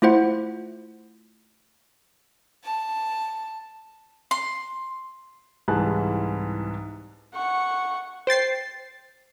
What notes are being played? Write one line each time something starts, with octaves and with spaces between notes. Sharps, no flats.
A3 E4 F4 C5 F#5
A5
C6
C2 G#2 E3 G#4 A5 F#6
F#5 C#6
C5 G5 A6 C7